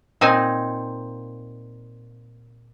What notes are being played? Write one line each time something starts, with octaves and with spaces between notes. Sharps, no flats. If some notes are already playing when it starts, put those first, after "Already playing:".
A#2 C4 D#4 G#5